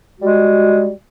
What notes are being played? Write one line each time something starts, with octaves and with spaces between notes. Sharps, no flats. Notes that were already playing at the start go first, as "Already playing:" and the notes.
G3 G#3 F#4